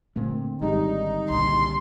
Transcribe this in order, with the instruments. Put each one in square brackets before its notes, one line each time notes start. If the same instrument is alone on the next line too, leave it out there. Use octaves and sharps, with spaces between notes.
[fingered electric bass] A#2 A3 [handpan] D3 C4
[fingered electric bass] G#1 D3 [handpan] D#3 G3 G#3 [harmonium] D#4
[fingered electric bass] C2 A#2 D3 [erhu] C6